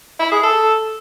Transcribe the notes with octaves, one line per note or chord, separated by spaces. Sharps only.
E4
G#4
A4